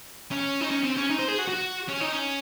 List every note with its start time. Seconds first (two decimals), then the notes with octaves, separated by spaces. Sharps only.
0.31 C#4
0.61 D#4
0.70 C#4
0.83 C4
0.96 C#4
1.10 D#4
1.19 C5
1.29 G#4
1.39 F#4
1.49 F#4
1.89 C#4
2.01 D#4
2.13 C#4